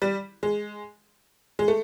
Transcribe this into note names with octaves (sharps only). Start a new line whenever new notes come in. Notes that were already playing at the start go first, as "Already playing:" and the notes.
G3
G#3
G#3
A3